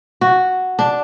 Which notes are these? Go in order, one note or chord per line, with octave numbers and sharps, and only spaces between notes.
F#4
D4